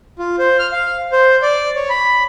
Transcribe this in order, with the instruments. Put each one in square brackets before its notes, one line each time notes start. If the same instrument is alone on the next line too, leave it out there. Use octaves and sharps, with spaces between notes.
[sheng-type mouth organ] F4
C5
F6
F5
C5
D5
C#5
B5